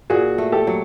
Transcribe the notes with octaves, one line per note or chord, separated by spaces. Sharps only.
A#2 F#4 G#4
A3
G4 A4
F#3